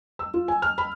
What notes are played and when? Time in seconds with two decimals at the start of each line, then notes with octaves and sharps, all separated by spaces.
0.19 E6
0.34 F4
0.48 G#5
0.62 F6
0.78 B5